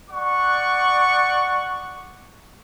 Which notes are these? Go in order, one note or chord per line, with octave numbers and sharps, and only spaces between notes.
D5 F#5 C#6